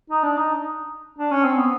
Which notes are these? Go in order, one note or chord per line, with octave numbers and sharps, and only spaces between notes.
D#4
D4
D#4
D4
C#4
C4
B3